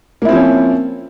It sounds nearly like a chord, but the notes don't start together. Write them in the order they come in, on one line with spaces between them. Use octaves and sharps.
A#3 E4 C4 F3 C#4